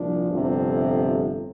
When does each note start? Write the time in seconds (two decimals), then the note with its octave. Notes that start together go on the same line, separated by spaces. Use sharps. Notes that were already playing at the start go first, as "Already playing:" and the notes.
Already playing: C2 A#2 F3 D4
0.30 G1 F2 C3